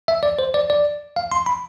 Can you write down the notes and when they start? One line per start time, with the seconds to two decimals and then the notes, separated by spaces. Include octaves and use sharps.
0.08 E5
0.23 D5
0.39 C5
0.54 D5
0.70 D5
1.16 F5
1.32 C6
1.46 B5